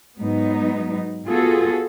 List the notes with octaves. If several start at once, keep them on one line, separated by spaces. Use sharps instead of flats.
G#2 F#3 B3 D#4
B3 F4 F#4 G#4 A4